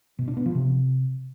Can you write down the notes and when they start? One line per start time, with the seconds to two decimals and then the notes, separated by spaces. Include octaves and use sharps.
0.19 B2
0.28 D4
0.37 B3
0.46 F3
0.55 C3